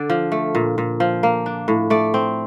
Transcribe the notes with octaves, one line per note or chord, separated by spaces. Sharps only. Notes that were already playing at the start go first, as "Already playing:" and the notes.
Already playing: D3 D5
F3
A3
A#2
A#2
F3
A#3
D4
A2
A3 D5
C4